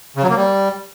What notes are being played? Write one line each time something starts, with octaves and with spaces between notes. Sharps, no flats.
C#3
F#3
A#3
G3